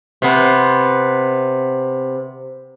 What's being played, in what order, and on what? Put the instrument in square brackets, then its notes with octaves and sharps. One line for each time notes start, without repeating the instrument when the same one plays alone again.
[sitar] C3 B3